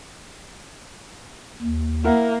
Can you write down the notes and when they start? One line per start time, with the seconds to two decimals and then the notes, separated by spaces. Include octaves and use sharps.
1.62 D#2
2.04 A#3 E4 A#4 F#5